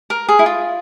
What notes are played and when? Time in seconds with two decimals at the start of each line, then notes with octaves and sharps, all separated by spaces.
0.10 A#4
0.29 G#4
0.39 E4
0.46 F4